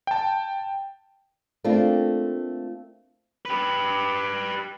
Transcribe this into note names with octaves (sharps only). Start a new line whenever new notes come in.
G5 A5
A3 A#3 C4 D4 F4
G4 B4